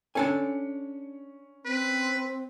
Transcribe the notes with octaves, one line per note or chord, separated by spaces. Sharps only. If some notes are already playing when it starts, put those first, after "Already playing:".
C#4 D4 A4 G#5 C#7
C4 B4